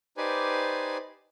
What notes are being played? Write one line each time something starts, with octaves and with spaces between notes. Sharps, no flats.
D#4 G4 B4 C5 D5 G#5